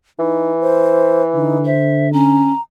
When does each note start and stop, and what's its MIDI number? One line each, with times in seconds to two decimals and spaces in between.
0.19 1.72 52
0.19 0.53 63
0.61 1.22 72
1.35 2.53 50
1.35 1.58 63
1.65 2.08 72
1.65 2.11 76
2.13 2.52 61
2.13 2.61 82